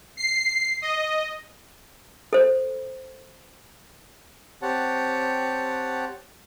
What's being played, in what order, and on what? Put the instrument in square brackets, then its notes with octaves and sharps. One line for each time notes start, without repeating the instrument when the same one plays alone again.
[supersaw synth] C7
D#5
[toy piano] A4 C5
[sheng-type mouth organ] C4 G4 C#5 F#5 A5